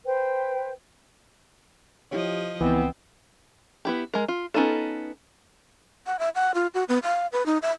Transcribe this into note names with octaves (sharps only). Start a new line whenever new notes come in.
B4 C5 G5
F3 E4 G4 C#5 D#5
C#2 E3 B3 C4
B3 E4 G4
G#3 A#4
F4
B3 C#4 D#4 F4 A4
F#5
E5
F#5
F4
F#4
B3
F5
B4
D#4
E5